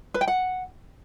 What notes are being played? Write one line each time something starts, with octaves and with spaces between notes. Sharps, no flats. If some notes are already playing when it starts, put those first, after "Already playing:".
B4
G5
F#5